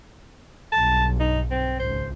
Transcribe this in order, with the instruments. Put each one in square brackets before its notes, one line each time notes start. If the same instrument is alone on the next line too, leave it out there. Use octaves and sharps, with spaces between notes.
[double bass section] B1 G2 [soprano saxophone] A5
[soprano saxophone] D#4
C4
[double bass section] G#1 C#2 [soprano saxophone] C5